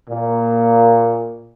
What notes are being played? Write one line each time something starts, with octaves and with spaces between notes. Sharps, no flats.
A#2